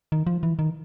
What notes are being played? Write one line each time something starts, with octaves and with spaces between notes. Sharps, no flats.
D#3
F3
E3
D#3